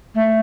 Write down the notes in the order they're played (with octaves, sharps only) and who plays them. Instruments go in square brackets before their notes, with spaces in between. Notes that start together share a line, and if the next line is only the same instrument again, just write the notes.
[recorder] A3